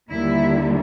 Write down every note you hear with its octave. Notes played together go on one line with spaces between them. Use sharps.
D#2 D3 G3 A#3 E4